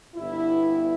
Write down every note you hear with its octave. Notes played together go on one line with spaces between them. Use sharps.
G1 G2 G3 B3 E4